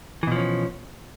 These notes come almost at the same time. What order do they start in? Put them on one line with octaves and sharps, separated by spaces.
E3 B2 F3 C#4